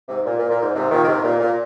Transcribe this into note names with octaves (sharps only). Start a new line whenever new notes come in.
G#2 C3
A#2
A#2
A#2
G#2
G#2 C3
A#2 D#3
D#3
G#2 C3
A#2
A#2